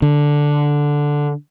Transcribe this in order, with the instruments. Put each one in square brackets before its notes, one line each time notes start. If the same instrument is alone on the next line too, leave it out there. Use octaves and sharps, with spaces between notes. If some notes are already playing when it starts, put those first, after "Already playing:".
[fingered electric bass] D3